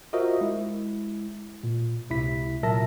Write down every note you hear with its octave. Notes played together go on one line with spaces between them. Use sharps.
F4 F#4 A#4 C5 D#5 E5
G#3 E4
A#2
C#2 C3 E4 B6
A#2 F#3 A#4 E5 A5 A#6